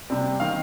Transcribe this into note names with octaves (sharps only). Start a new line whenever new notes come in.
C3 G3 C4
D#3 C4 F5